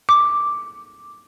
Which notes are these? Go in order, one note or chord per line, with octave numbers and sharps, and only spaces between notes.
D6